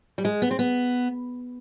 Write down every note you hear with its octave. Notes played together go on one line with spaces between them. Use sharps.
G3
G#3
B3
C4
B3